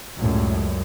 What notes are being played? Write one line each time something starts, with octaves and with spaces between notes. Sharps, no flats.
C#2 F#2 A2 G3